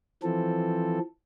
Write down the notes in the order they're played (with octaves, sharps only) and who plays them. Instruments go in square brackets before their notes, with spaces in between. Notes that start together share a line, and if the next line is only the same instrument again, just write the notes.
[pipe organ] E3 F3 C4 A4